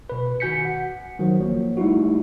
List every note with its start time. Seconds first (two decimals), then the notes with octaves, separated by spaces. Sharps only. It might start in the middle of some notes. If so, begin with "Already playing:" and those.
0.10 B2 B4
0.40 D#3 F#4 G#5 G6 B6 C#7
0.65 F#5
1.19 D#3 F#3 F#4 C5
1.39 G#1 F3 A#3 C#5
1.77 G3 A3 D#4 E4 F#4